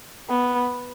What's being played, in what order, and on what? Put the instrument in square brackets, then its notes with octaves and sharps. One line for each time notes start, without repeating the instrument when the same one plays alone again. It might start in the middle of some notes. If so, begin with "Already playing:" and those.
[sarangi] B3